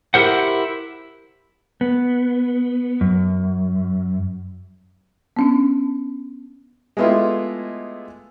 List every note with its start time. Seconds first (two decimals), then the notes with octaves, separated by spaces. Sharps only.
0.14 E4 G4 A#4 C5 F#5
1.81 B3
3.01 F#2
5.37 B3 C#4 D4
6.97 G#3 A3 B3 E4 F4 G4